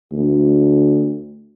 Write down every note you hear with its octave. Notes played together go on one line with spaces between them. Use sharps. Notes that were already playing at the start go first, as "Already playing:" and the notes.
D2